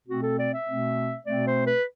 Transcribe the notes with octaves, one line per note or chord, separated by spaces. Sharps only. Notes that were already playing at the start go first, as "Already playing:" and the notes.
B2 A3 C4 F#4
A4
D5
E5
B2 A3 C4
B2 A3 C4 D5
C5
B4